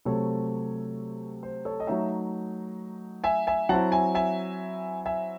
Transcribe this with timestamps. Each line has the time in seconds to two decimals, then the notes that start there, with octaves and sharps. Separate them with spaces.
0.05 C3 F#3 A3 C4 A4 C#5
1.43 C5
1.65 A4 C#5
1.80 D#5
1.87 F#3 A3 D#4 C#5 E5
3.24 E5 G#5
3.47 E5 G#5
3.69 F#3 C4 E4 F#5 A5
3.92 E5 G#5
4.15 E5 G#5
5.06 E5 G#5